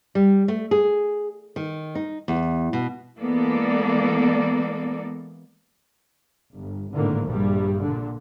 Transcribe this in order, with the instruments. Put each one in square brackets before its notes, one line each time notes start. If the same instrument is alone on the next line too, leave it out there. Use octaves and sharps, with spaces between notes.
[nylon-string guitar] G3
A3
G#4
D#3
D#4
E2
B2
[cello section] E3 G#3 A#3 B3 A4 D5
[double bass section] G1
G#1 A2 D3 A#3
A#1 G2 G3
A#2 D3